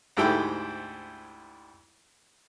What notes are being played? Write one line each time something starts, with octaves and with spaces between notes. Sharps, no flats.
D2 G#2 E4 G4 A4 G5